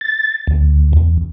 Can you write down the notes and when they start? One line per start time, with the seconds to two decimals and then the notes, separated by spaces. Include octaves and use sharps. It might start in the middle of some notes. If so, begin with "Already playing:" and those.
0.01 A6
0.47 D2
0.93 E2